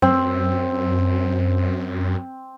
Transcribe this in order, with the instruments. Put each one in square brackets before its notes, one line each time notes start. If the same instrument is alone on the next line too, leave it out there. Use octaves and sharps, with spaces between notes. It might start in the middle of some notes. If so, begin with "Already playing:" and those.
[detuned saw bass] F#2 [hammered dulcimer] C4